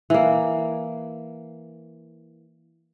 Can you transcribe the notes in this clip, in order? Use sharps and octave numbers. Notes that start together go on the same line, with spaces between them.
E3 A#3